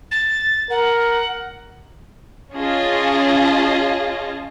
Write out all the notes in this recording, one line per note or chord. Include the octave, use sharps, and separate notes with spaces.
A6
A#4 F#5
C#4 F4 G#4 D#5 A5